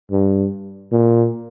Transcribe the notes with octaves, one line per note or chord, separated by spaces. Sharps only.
G2
A#2